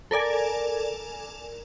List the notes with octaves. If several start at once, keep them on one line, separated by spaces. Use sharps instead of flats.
A4 A#4 D5 G#5